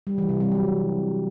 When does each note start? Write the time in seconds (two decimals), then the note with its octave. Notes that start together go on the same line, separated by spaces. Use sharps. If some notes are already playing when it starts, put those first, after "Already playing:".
0.07 G3
0.18 E3
0.29 C3
0.40 G3
0.52 F#3